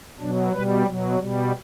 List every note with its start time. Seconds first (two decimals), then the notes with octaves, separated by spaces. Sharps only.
0.19 B2 F#3 D4
0.53 B2 G3 B4
0.86 B2 F#3
1.19 B2 G3